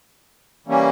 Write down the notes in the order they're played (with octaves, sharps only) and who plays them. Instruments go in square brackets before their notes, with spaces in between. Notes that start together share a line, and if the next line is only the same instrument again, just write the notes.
[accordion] E3 G3 A#3 C#4